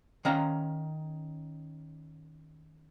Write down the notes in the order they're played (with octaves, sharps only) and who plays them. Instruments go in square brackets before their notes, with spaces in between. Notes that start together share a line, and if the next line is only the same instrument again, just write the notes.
[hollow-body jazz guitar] D#3 C#4 F5 F#5 A#5